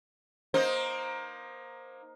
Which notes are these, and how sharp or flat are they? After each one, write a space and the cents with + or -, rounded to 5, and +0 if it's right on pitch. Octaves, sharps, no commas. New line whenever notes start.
A#3 +25 D#4 +0 C5 +10